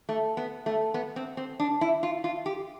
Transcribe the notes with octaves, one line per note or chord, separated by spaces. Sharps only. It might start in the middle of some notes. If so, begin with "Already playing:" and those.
A3
B3
A3
B3
C4
C4
D4
E4
F4
F4
G4